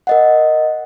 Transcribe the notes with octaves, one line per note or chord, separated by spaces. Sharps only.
A#4 D#5 F#5